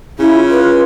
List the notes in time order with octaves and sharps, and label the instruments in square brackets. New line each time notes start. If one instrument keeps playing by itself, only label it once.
[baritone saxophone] C#3 [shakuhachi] E4
[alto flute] F4
[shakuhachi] B4